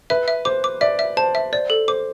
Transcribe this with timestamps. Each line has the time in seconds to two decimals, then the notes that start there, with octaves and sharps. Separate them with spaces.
0.10 B4 E5
0.28 E5
0.45 C5 D6
0.64 D6
0.81 D5 E5
0.99 E5
1.17 C5 A5
1.35 E5
1.53 C5 D5
1.70 A4
1.88 C5 D6